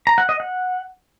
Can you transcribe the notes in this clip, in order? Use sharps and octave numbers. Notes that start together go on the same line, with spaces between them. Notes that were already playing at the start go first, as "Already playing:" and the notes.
A#5
F#5
D#5
F#5